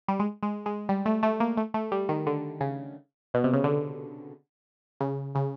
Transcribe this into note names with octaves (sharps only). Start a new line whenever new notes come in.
G3
G#3
G#3
G#3
G3
A3
A3
A#3
A3
A3
G3
D#3
D3
C#3
B2
C3
C#3
D3
C#3
C#3